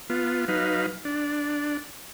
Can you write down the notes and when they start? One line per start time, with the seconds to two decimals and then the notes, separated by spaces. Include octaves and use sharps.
0.10 B3 F4
0.48 F#3 D#4 B4 F5
1.05 D4